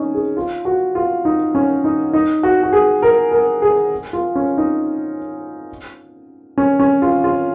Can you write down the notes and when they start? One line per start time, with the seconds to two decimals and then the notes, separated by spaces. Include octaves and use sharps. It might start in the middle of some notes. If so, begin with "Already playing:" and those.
Already playing: C#4 D#4
0.14 G#4
0.37 F4
0.65 F#4
0.95 F4
1.25 D#4
1.55 C#4
1.84 D#4
2.13 D#4
2.43 F#4
2.63 F#4
2.73 G#4
3.03 A#4
3.32 A#4
3.62 G#4
4.13 F4
4.35 C#4
4.58 D#4
6.58 C#4
6.80 C#4
7.02 F4
7.24 F4